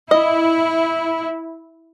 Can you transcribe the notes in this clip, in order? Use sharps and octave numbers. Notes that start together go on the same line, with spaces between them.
E4 D#5